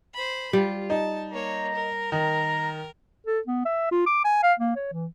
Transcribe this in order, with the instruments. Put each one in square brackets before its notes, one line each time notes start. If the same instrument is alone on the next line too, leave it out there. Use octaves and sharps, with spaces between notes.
[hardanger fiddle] C5 B5
[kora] G3 [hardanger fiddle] F4
[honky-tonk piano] D#4 [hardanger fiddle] A5
[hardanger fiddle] A#3 C#5 [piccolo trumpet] A#5
[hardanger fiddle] A#4
[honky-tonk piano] D#3 [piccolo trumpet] A#5
[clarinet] A4
B3
E5
F4
D6
G#5
F5
A#3
C#5
E3